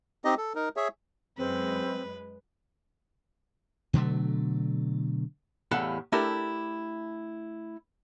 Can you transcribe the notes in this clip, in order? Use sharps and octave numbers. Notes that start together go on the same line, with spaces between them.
C4 D#4 G4 D#5
A4
D#4 A#4
G#4 C#5 E5
F#2 G#3 C4 B4
B2 D3 F#3 A3
E2 A2 G3 A4 F5 F#5
A3 D4 E4 G4 A4 A#4